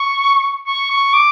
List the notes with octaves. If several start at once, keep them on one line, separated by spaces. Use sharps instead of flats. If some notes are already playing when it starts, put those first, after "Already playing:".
Already playing: C#6
C#6
C#6
D6